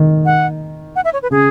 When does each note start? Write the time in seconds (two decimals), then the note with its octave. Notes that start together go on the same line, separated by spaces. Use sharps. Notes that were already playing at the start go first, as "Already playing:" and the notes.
Already playing: D#3
0.26 F#5
0.96 F#5
1.05 E5
1.13 C#5
1.23 B4
1.31 C#3 G#4